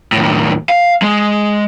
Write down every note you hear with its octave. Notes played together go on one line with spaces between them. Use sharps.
D#2 A2
F5
G#3